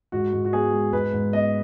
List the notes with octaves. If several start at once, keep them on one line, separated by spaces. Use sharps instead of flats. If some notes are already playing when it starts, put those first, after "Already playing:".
G#2 F#4
G#2
F#4
B3 G#4
G#3
G#2 B4
G#2
B3 D#5